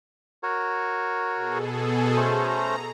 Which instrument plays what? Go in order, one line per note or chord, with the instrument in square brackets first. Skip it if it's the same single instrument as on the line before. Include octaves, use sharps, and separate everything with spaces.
[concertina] F#4 A#4 C#5
[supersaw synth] B2 G#4 A4
[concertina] A3 C#4 C5 [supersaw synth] A#5